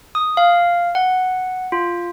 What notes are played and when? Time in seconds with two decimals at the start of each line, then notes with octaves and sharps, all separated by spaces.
0.15 D#6
0.37 F5
0.95 F#5
1.72 F4